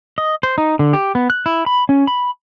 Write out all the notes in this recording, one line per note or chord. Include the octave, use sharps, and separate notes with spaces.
D#5
C5
D#4
D3
G4
B3
F#6
E4
B5
C#4
B5